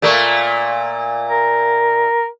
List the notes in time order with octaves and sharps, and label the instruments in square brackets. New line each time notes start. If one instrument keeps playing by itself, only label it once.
[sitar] A#2 A3 A#3
[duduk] A#4